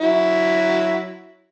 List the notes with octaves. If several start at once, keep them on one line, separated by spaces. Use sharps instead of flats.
F#3 E4